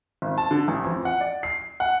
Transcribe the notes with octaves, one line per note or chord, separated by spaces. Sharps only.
G#1
A5
D3
A1
F2
F#5
D5
C7
F#5